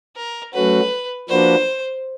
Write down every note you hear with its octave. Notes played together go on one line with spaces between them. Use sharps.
A#4
F#3 A3 C#4 F#4 B4
F3 A#3 D4 F#4 B4 C5